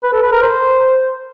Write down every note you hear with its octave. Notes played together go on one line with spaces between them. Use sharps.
B4
A4
B4
A#4
C5